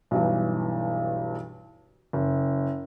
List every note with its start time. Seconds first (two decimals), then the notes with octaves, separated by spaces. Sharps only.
0.11 B1 G2 E3
2.13 F#1